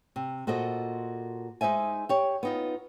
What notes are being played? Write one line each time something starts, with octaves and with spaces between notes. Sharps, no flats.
C3
A#2 F#4 A4 C5 D#5
G#3 D#4 C5 E5 G#5
G4 C#5
B3 D#4 F4